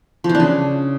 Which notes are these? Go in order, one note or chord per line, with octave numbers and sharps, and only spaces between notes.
F3
E3
D4
C#3